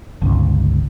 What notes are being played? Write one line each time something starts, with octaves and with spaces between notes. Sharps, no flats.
G1 C#2